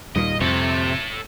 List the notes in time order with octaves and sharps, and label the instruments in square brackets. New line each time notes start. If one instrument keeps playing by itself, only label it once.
[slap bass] D#2 A#2 [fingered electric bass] G3 [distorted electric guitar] D#5
[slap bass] F2 [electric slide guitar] C3 [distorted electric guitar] A4 C#5